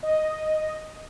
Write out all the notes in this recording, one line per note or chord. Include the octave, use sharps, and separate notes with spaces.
D#5